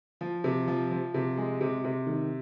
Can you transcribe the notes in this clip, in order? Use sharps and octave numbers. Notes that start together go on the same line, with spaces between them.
F3
C3
F3
F3
C3
G#3
C3
C3
D#3